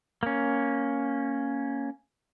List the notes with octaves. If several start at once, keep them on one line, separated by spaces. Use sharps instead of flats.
A#3 C#4